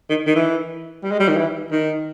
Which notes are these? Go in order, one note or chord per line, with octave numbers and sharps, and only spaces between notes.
D#3
D#3
E3
G3
G#3
G3
D#3
E3
D#3